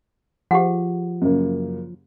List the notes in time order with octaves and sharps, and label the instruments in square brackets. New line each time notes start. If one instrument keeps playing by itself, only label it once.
[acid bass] F3 [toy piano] G4 G#4 F#5
[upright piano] F#2 C#3 A#3